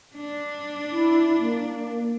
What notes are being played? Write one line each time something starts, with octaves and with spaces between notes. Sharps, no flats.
D4
E4
A#3